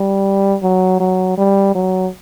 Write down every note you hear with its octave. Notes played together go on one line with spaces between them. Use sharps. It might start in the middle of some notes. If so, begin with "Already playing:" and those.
Already playing: G3
F#3
F#3
G3
F#3